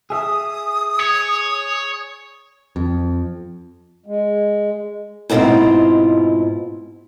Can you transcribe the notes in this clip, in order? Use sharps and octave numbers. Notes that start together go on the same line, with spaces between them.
G#4 E5 D#6
C#5
F2
G#3
G#2 B2 B3 C4 E4 F4